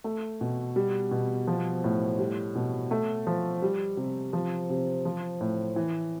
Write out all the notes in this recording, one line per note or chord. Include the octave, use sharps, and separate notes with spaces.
A3
B2
G3
B2
F3
A2
G3
B2
A3
F3
G3
C3
F3
C3
F3
A2
E3